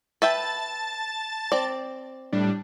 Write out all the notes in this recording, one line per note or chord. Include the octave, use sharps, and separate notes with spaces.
B4 E5 G5 A5 A6
C4 D5
A2 G3 D4